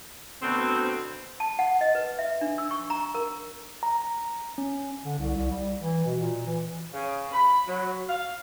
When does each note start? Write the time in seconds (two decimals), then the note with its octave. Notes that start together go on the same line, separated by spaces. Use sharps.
0.42 D2 B2 C4
1.40 A5
1.59 F#5
1.81 D#5
1.95 B4
2.19 E5
2.41 D4
2.58 E6
2.71 C#6
2.90 A#5
3.15 A#4
3.83 A#5
4.58 C#4
5.05 D3
5.19 C2
5.35 C2
5.51 G3
5.82 E3
6.05 B2
6.20 A#2
6.47 E3
6.93 C#3
7.33 B5
7.67 F#3
8.08 F5